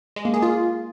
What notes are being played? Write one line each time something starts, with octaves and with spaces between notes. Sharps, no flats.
G#3
A#3
G#4
F4